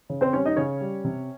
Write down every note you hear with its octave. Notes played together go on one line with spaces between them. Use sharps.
C#3
C4 C5
G3 C#4 C#5
D#4 D#5
C#3 C#4 C#5
G3
C3